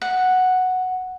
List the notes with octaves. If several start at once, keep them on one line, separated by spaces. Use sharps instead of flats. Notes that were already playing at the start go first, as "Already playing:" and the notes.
F#5